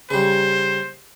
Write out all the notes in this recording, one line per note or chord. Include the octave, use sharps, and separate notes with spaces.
C#3 G3 C5